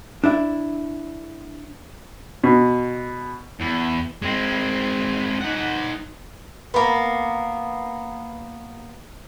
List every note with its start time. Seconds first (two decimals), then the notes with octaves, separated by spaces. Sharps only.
0.24 D4 E4 E5
2.44 B2
3.60 E2
4.22 G#3 C4
5.41 D#4 F#5
6.74 A#3 B3